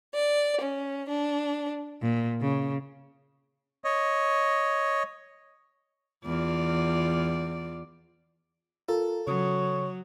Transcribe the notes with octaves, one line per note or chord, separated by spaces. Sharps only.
D5
C#4
D4
A#2
C#3
C#5 D#5
E2 F4 D5
F4 A4 A#4
C#3 F#3 C#5 D#6